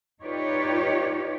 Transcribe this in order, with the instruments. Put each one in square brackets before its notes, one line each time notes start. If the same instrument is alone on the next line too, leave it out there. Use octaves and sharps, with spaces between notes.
[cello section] D#4 F4 G4 B4 C#5 D5